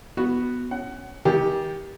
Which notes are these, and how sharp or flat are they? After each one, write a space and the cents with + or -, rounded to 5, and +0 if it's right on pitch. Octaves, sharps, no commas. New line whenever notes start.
B3 +0 F#4 +0
C#4 +0 F#5 +25
D#3 +35 G4 +0 G#5 +0